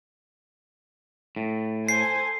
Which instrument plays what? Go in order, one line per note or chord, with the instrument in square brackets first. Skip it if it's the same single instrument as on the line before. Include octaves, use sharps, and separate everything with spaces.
[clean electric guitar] A2
[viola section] A4 C5 G#5 [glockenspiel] C7